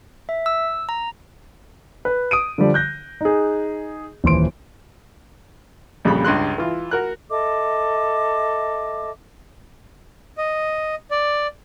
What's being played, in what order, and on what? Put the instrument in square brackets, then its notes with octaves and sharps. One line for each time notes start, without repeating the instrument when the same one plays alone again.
[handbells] E5
E6
A#5
[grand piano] B4
D#6 D7 D#7
D3 F3 G3
F#6 G6 A#6
D#4 G#4
D#1 E3 C5 C6 D7
[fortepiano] A#1 F2 C#3 G3 B5
C#2 G2 C6 F#6
E3 F4
F#4 A#4 F#6
[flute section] A4 D#5 E5 D6
[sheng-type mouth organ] D#5
D5